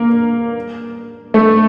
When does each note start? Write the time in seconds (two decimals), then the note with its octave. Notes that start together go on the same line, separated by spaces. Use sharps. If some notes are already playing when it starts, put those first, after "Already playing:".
Already playing: A#3
1.34 A3